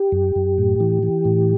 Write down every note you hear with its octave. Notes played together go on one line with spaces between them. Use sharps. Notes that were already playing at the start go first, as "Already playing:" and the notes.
Already playing: G4
F#2
F#2
A2
E3
E3
A2